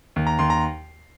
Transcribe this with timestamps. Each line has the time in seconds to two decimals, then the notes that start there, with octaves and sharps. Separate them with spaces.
0.16 D#2
0.27 A#5
0.39 D#2 C6
0.50 A#5